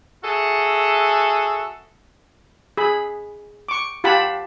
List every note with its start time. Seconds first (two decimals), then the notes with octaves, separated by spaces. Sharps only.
0.23 F#4 G#4 A4 E5
2.77 G#4 B5
3.69 C#6 D6
4.04 F4 G4 F#5 A5 B5